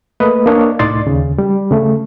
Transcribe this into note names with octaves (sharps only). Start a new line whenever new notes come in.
A3 A#3 B4 D#5
A#3 D4 C#5 D#5
C2 A2 D#4 D5 C6 A6
D#2 C#3
G3
C#3 A3